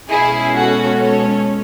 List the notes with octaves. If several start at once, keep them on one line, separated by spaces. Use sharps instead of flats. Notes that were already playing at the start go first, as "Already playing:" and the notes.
B2 G#3 C#4 E4 G#4
F#4 A4
A4 C#5